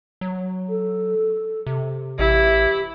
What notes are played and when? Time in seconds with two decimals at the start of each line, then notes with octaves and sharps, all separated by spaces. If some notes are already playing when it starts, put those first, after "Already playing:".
0.21 F#3
0.69 A4
1.66 C3
2.19 A1 E4 G4